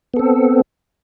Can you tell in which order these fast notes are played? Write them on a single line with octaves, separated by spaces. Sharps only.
B3 A4 C4